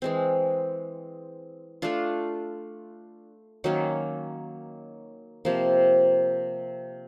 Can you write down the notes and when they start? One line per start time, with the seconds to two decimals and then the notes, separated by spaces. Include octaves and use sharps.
0.02 E3 G#3 C4
1.82 A3 D4 F4
3.64 D#3 F#3 A#3 C#4
5.45 C3 F3 A#3